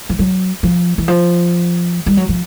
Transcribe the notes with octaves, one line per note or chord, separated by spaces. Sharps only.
F3
F#3
F3
E3
F3
G3
F#3
F3